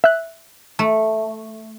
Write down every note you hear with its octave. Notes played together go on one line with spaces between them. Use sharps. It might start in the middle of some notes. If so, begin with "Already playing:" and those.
E5 F#6
A3